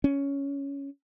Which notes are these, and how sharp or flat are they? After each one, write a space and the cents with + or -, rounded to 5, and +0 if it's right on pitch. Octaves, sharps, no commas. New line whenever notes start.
C#4 +10